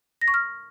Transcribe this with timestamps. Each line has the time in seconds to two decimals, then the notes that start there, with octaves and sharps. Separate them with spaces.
0.21 A#6
0.28 C#6
0.34 F6